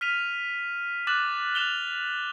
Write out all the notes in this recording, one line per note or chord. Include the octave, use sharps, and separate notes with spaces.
F6 B6 D#7 F7
D6 F#6 A6 E7 F#7
F#6 E7 F7 G7